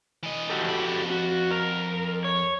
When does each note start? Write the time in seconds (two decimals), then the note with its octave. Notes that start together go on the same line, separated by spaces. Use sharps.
0.23 E3 D#5
0.50 F#4 G4 A4
0.64 F2 B5
1.10 F#4
1.51 A#4
2.24 C#5